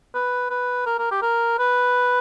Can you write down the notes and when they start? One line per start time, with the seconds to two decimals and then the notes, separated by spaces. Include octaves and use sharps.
0.14 B4
0.50 B4
0.86 A#4
0.98 A#4
1.11 G4
1.22 A#4
1.59 B4